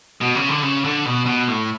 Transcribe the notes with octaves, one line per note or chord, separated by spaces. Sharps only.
B2
C#3
D3
C#3
D3
B2
B2
A2